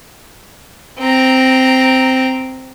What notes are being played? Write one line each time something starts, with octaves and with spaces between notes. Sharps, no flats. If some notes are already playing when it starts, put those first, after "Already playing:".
C4 A#5